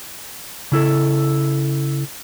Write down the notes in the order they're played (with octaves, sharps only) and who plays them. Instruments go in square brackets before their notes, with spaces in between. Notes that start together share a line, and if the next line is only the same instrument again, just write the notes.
[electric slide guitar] C#3 E4 A4